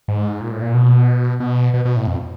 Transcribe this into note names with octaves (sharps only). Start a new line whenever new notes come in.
G#2
A#2
A2
A#2
B2
B2
B2
B2
A2
F2